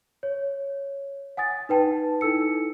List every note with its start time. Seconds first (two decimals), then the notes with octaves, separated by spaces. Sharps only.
0.23 C#5
1.37 F#5 G#5 D#6 A6
1.69 D#4 B4 G5 A5
2.21 D#4 E4 A4 E6 C#7